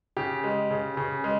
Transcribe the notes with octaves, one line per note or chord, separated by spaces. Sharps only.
C#3 G4
G#3
C#3
C#3
G#3